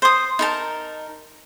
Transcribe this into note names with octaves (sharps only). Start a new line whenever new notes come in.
C5 D#6
D#4 A#4 A5